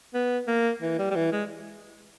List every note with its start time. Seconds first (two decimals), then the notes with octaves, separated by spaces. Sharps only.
0.14 B3
0.47 A#3
0.82 E3
0.99 G3
1.11 G3
1.16 E3
1.32 G#3